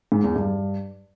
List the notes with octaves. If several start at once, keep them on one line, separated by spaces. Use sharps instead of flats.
G#2
E2
G2